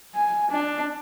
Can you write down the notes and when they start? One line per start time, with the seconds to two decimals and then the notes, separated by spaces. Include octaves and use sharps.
0.15 G#5
0.51 D4